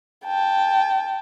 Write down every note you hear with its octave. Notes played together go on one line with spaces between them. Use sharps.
G5 A5